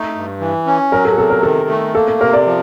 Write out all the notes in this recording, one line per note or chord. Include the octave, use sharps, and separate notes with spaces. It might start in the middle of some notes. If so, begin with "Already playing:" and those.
Already playing: A3 D#4
G2
E3
C#4
F#3 A#4
A4
G#4
C3 A4
A#4
D#3 A4
A3
A#3 A4
A4
C3 A#4
D5
F3